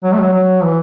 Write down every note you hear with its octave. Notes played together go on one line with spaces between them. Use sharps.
F#3
A3
F#3
F#3
E3